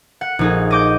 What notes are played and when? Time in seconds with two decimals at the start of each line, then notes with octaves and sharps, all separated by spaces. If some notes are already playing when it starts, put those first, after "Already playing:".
0.21 F#5
0.39 A#1 D#4 G#4
0.71 D#5 D6 G6